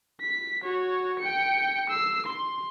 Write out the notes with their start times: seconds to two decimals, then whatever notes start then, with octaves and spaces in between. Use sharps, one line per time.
0.21 B6
0.63 F#4 C#5
1.20 G5 C#7
1.90 E6 C7
2.26 C6